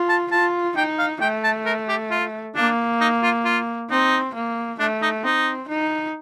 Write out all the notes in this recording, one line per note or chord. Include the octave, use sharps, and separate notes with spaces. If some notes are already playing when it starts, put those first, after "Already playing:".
Already playing: F4
A5
F4 A5
D#4 G5
F5
A3 G5
A5
A#4
G4
F4
A#3 D4
D#4
F4
F4
C4 D#4
A#3
A3 D4
D#4
C4 D#4
D#4